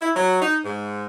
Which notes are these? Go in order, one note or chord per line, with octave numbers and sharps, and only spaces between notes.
E4
F#3
D#4
G#2